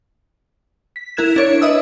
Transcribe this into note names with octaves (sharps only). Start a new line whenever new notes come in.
B6
E4 A#4 F#6 G#6 E7
D4 C#5 D7
B4 D#5 E5 D#6 E6